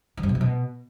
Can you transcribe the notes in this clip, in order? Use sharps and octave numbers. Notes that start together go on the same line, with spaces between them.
E3
G2
B2
F#3
B2